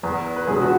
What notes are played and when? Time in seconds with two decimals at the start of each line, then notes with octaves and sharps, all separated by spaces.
0.03 E2 B4
0.36 B4
0.47 E1 G#4
0.62 F#4